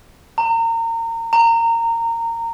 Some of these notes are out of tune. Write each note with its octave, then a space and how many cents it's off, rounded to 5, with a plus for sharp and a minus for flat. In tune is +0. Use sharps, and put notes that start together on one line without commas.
A#5 -30
A#5 -20